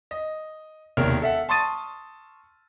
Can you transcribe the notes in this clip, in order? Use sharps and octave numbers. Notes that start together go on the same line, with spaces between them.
D#5
E1 D#2 C3 A#4 C#5 F6
A4 E5 F#5
A5 C6 C#6 D#6 A6 D#7